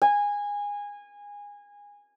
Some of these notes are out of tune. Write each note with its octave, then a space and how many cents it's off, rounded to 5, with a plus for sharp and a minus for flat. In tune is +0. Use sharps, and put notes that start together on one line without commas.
G#5 -20